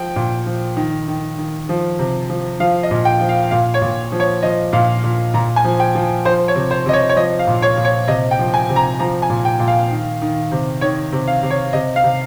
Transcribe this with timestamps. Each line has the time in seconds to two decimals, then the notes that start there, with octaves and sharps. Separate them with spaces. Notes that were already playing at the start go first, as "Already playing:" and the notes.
Already playing: F3 G5
0.16 A#2
0.46 F3
0.77 D#3
1.08 D#3
1.38 D#3
1.69 F3
1.99 C3
2.30 F3
2.60 F3 F5
2.83 D#5
2.91 A#2
3.05 G5
3.21 F3
3.29 F5
3.51 A#2 F5
3.74 C#5
3.81 A#2
4.12 F3
4.20 C#5
4.43 F3 D#5
4.73 A#2 F5
5.04 A#2
5.34 A#2 A#5
5.56 G#5
5.64 F3
5.80 G5
5.95 F3
6.25 F3 C5
6.48 C#5
6.56 C3
6.71 C5
6.86 C3 D#5
6.93 C#5
7.09 C#5
7.16 F3 D#5
7.39 F5
7.47 A#2
7.62 C#5
7.77 A#2
7.85 C#5
8.08 C3 D#5
8.31 G5
8.39 F3
8.54 G#5
8.69 C3
8.76 A#5
8.99 F3 A#5
9.22 G#5
9.30 A#2
9.45 G5
9.60 A#2
9.68 F5
9.91 D#3
10.22 D#3
10.52 C3
10.81 D#3 C#5
11.13 C3
11.28 F5
11.43 C3
11.50 C#5
11.73 C3 D#5
11.96 F5
12.04 C3